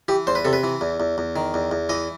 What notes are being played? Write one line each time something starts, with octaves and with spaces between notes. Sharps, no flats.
E3 G4
E2 C5
B4
C3 A4
B4
E3
E2
E2
E2
D#3
E2
E2
E3 D#5